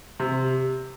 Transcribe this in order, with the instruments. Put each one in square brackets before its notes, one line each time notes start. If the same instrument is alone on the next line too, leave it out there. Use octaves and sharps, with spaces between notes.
[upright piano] C3